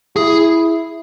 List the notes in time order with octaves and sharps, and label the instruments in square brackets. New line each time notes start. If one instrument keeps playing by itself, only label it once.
[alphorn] E4 [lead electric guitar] G#4